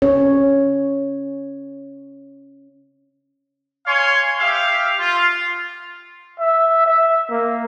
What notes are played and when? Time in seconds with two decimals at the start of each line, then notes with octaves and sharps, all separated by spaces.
0.02 C#4 C#5
3.86 C#5 F5 G#5 C6
4.39 G4 E5 F5
4.99 F4
6.39 E5
6.86 E5
7.30 A#3